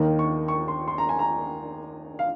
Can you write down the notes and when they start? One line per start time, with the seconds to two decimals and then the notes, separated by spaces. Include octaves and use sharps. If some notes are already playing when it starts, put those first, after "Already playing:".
Already playing: D#2 D#3 A#3 D#4
0.19 C#6
0.48 C#6
0.68 C6
0.88 C6
0.98 A#5
1.09 G#5
1.19 A#5
2.19 F5